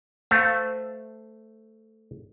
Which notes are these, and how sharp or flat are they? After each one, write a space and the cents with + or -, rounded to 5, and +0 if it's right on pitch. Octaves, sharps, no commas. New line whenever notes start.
A3 +0 C5 -20 F5 +0